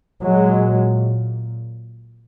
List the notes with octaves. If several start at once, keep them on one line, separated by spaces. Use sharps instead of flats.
A#2 F#3 G#3